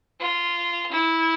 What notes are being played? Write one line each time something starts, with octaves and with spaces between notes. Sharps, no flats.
F4
E4